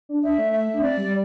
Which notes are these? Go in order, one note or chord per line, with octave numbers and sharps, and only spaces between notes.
D4
D4 E5
A3
E5
D4
C4 D5
G3